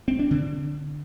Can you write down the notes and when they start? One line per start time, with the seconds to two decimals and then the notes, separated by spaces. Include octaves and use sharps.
0.08 C4
0.19 D4
0.31 D3